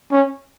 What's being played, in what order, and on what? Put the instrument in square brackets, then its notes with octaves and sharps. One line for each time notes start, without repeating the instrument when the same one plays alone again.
[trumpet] C#4